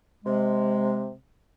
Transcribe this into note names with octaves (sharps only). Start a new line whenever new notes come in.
C3 G#3